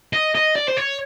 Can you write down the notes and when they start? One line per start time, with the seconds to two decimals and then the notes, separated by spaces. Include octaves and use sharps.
0.13 D#5
0.35 D#5
0.55 D5
0.67 C5
0.77 C#5